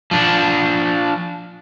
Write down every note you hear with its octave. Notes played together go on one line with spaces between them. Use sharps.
F3 D4